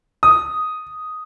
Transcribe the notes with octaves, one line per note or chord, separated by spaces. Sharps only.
D#6